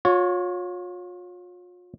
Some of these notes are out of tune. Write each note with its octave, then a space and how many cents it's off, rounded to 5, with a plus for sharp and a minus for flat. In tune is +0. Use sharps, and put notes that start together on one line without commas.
F4 +40 C#5 +0